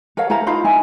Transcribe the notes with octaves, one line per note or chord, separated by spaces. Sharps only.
A4 A#4 C#5 F5
E4 A4 C5 A#5
D#4 F4 C5 B5
D#4 E4 G#5